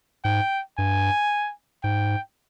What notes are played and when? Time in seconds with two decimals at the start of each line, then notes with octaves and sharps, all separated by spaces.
0.25 G#2 G5
0.78 G2 G#5
1.84 G#2 G5